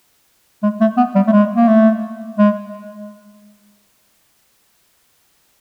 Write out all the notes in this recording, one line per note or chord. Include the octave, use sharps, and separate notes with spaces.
G#3
A3
B3
G3
A3
G#3
A#3
A3
G#3